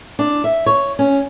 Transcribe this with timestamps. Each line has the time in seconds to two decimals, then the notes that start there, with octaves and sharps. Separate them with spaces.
0.19 D4
0.44 E5
0.66 C#5
0.99 C#4